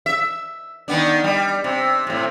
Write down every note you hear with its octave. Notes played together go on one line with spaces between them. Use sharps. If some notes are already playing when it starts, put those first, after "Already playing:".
E5
D#3 B3 D4
G3
C3
A2 C3